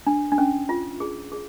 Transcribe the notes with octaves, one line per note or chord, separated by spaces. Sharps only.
D4
D4
C#4
F4
G#4
G#4